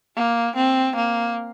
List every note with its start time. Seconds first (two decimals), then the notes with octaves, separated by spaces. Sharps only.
0.16 A#3
0.56 C4
0.96 A#3